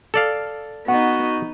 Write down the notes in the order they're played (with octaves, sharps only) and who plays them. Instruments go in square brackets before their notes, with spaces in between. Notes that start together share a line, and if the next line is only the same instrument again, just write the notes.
[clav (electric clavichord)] A4 D5 F5
[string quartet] B3 D#4 [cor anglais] F#4 [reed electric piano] F#5